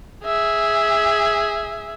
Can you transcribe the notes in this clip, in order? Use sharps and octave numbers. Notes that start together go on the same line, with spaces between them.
G#4 E5